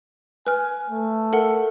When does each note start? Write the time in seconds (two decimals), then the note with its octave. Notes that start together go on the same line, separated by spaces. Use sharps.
0.47 B4 G#5 F6
0.90 A3
1.33 A4 A#4 F#5